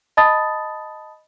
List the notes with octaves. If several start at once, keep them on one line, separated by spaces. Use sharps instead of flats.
D#5 A5 B5 D#6 A6